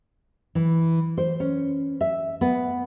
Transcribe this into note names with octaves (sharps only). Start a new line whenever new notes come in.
E3
C5
C#4
E5
B3